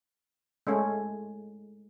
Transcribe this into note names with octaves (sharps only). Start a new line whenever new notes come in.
G#3 A3 C#4